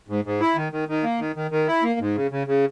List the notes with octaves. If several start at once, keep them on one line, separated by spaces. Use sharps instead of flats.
G#2
G#2
E4
D#3
D#3
D#3
A#3
D#3
D#3
D#3
E4
A#3
G#2
C#3
C#3
C#3